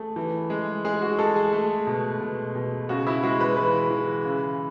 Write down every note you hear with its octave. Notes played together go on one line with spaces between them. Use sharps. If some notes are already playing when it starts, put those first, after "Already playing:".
Already playing: A3 G#4
E3
G#3
G#3 G#4
F#4
G#3 A4
G#4
A3
B2
B2
B2
C#3 F#4
E4
G#3 F#4
B4
E3 B4
E3
C#3